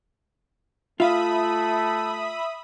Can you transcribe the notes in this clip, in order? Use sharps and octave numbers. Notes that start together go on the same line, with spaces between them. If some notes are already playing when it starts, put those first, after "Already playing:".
A3 F4 E5 F5 B5 D#6